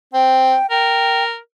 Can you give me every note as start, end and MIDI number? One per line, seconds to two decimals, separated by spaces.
0.14 0.56 60
0.14 0.70 79
0.70 1.37 70
0.70 1.24 79